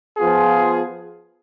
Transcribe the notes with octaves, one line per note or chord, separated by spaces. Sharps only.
F3 B3 F4 G#4